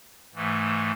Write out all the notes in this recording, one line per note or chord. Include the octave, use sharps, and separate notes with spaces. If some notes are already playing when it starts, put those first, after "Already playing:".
G#2 E3 A3